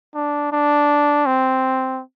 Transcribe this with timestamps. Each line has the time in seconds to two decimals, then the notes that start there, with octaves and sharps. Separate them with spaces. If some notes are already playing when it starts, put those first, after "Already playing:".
0.15 D4
0.52 D4
1.26 C4